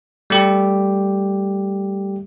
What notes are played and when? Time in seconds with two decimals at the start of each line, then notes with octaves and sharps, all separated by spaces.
0.30 G3 A3 G4